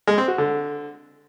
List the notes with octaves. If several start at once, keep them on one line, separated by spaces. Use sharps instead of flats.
G#3
C4
F#4
D3